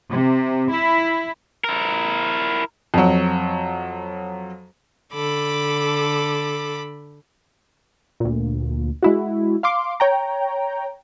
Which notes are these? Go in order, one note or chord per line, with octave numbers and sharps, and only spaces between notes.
C3
E4
E4 A#4
F2 F#3
D3 A4 B5 D6
D2 A#2
G#3 E4 F#4
F5 C6 D6
C#5 G5 A#5